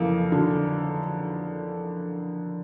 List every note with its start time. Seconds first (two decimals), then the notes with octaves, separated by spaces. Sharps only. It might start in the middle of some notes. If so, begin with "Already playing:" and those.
Already playing: F2 C#3 E3 A#3 A4
0.32 D3